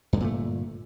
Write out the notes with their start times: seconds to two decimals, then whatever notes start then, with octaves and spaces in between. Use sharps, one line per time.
0.13 G2
0.17 D3
0.20 A#2
0.24 A3